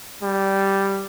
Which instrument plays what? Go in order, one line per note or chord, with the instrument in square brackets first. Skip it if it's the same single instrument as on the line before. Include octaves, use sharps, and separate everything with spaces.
[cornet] G3